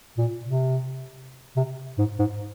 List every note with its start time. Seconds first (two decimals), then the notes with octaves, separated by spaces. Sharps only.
0.17 A#2
0.45 C3
1.56 C3
1.98 G#2
2.19 G#2